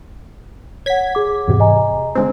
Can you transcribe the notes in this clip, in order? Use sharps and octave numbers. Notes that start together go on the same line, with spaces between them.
C#5 F#5 G#6 B6
G#4 D6
E2 G#2 C3
D#5 G#5 A#5
D3 G#3 C4